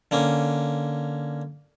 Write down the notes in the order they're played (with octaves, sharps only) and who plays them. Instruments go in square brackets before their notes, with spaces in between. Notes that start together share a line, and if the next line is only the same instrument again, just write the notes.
[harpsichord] D3 A#3 C#4